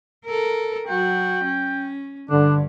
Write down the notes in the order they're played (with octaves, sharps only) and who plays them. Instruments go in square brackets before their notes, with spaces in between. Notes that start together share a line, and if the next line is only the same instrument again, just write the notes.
[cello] A4 A#4
[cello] F#3 F#4 [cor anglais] G5
[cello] C#4
[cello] G2 [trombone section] D3 [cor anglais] D4